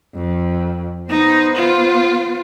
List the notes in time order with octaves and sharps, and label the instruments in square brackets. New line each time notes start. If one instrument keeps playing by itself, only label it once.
[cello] F2
[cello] B3 C5 [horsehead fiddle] D#4
[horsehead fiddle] F4